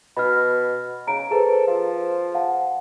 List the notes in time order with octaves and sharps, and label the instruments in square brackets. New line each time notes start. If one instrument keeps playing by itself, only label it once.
[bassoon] B2 [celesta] B5 F6
[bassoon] C#3 [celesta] A#5 D7
[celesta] G#4 B4 C5 [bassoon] A4
[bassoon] F3
[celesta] F5 F#5 A5